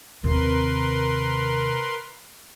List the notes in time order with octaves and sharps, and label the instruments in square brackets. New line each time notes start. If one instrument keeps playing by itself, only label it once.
[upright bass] D#2 C3 [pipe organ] A#4 B4 C6